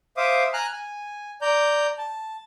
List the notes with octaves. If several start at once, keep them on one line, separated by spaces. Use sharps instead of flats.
C5 E5 F5 D6 D#6
G#5 A#5 F6 F#6
G#5
D5 A#5 G6
A5